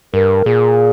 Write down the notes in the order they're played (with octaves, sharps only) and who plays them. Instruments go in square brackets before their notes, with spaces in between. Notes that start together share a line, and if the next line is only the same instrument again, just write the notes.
[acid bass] G2 [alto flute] A#4
[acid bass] A#2 [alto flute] G#4